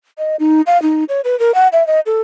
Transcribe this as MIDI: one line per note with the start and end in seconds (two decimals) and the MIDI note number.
0.18 0.36 75
0.40 0.61 63
0.67 0.81 77
0.82 1.04 63
1.09 1.21 73
1.24 1.38 71
1.39 1.54 70
1.54 1.68 78
1.72 1.86 76
1.87 2.00 75
2.06 2.22 69